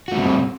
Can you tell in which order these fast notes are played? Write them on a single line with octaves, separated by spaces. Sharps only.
F#4 A3 G3 C4